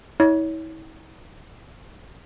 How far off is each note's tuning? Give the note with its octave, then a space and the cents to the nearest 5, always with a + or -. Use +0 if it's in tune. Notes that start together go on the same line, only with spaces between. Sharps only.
E4 -40 C#5 +20